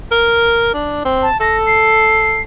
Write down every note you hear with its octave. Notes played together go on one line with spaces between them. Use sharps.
A#4
D4
C4
A5
A4 A#6
C7